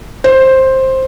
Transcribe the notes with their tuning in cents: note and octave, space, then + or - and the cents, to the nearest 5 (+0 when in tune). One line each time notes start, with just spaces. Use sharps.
C5 +10